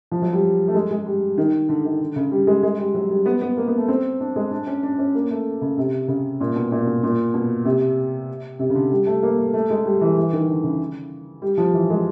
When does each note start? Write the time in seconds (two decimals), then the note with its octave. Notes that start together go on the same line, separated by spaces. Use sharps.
0.11 F3
0.22 F#3
0.33 G3
0.68 A3
0.74 G#3
0.91 G#3
1.06 G3
1.38 D#3
1.69 D3
1.85 D#3
2.00 D3
2.16 C#3
2.31 G3
2.47 G#3
2.63 G#3
2.78 G3
2.94 F#3
3.10 G3
3.26 B3
3.41 B3
3.57 A#3
3.67 B3
3.78 A3
3.88 C4
4.20 D4
4.36 G#3
4.51 D4
4.67 C#4
4.83 D4
4.99 C#4
5.15 A#3
5.31 A3
5.61 C#3
5.77 C3
6.08 C#3
6.40 A#2
6.56 B2
6.71 A#2
6.87 B2
7.03 A#2
7.34 B2
7.65 C3
8.59 C3
8.70 C#3
8.75 D3
8.92 G3
9.06 A3
9.23 A#3
9.38 A3
9.53 A3
9.70 G#3
9.85 G3
10.01 E3
10.17 E3
10.33 D#3
10.48 D3
10.63 C#3
11.42 G3
11.58 F3
11.74 E3
11.90 G#3